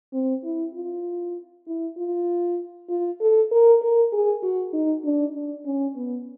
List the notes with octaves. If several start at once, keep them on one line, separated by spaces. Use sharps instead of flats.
C4
E4
F4
E4
F4
F4
A4
A#4
A#4
G#4
F#4
D#4
D4
D4
C#4
B3